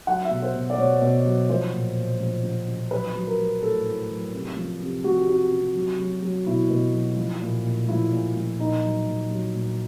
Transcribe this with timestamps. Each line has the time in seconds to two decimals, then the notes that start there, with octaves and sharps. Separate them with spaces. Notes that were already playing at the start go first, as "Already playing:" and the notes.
0.07 F#3 F#5
0.25 E5
0.30 B2
0.42 C5
0.55 B2
0.70 D5
0.78 B2 C#5
1.01 B2
1.25 F#3
1.49 F3 C5
1.73 A#2
1.96 A#2
2.20 F3
2.43 F3
2.68 F3
2.91 F#3 B4
3.15 F#3
3.27 A#4
3.39 F#3
3.62 A2 A4
3.86 A2
4.10 F#3
4.33 C3
4.57 F3
4.81 C3
5.04 F3 F#4
5.17 G4
5.27 C3 F#4
5.52 C3
5.75 F#3
5.99 F#3
6.22 F#3
6.47 B2 E4
6.70 B2
6.94 F#3
7.17 F3
7.42 A#2
7.65 A#2
7.88 F3 E4
8.12 A#2
8.36 F3
8.60 A#2 D#4
8.84 F#3
9.07 A#2
9.30 F#3
9.54 A#2